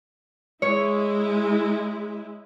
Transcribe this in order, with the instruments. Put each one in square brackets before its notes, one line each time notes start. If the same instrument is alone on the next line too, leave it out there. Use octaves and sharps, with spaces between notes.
[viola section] G#3 E4 [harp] C#5